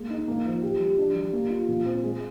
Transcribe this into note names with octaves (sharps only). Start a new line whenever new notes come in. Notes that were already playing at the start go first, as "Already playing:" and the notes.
Already playing: G#3 A#3
D#4
A#3
F3
G4
G3
D4
G3
A#3
F4
A#2
C4
G#3